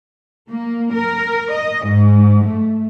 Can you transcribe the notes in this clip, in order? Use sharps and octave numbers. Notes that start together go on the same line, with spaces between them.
A#3
A#4
D#5
G#2
A3